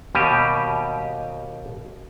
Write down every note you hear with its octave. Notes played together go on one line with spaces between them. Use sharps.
D#2 B2 G3 G4 D#5 G#5